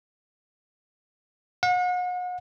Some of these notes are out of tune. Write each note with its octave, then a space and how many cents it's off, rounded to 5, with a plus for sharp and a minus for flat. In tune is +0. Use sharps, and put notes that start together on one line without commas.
F#5 -40